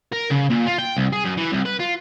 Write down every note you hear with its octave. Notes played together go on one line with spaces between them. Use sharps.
A#4
C#3
A#2
F4
G5
C2
G#4
F#2
E3
C2
B4
F4